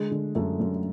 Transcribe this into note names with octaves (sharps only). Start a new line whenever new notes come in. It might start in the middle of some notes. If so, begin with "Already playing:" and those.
Already playing: D3 G#3 G#4
D3
F#2 A3 A4
F#2